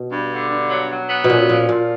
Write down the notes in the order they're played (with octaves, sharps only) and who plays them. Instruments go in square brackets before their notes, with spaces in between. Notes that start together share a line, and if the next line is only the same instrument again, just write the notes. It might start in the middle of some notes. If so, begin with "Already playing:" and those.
Already playing: [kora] B2
[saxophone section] G2
D3
G2
F#3
F#3
B3
[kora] B2
[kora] A#2 [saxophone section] C#4
[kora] A#2 [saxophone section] F3
[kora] A#2 [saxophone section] F3